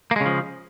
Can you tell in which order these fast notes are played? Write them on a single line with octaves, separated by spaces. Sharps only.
A#3 G#3 C#3 F3